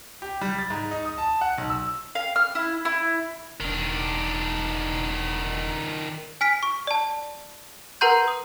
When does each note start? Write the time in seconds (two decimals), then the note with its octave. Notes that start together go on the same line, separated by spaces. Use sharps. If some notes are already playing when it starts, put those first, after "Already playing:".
0.22 G4
0.41 G3
0.59 A6
0.70 G#2
0.91 D#4
1.05 D#6
1.18 A5
1.41 F#5
1.58 B1
1.70 E6
2.15 F5
2.36 F6
2.55 E4
2.85 E4
3.61 E1 D#3 D4
6.41 G#5 F6 B6 D7
6.63 C#6
6.87 D5 A5
8.01 A#4 B4 F#5 A#5 C6 G6
8.28 D#6